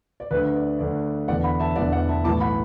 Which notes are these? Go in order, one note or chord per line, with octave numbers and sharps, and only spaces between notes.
D5
D2 D3 B4
D5
D2 D3 D5
E1 E2 D3 D5 F#5
F#5 B5
E5 A5
E1 E2 D3 D5 F#5
D5 F#5
E5 A5
B1 A2 E3 A5 D6
F#5 B5